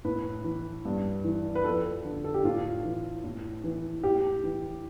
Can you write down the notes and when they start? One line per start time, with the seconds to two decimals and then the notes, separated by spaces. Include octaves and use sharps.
0.05 A2 B4
0.44 E3
0.85 G2
1.24 E3
1.55 B4
1.64 F2 A4
2.05 D3
2.24 A4
2.34 G4
2.44 A2 F4
2.85 E3
3.24 A2
3.64 E3
4.03 A2 G4
4.44 E3